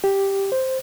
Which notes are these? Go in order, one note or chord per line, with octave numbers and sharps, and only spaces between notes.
G4
C5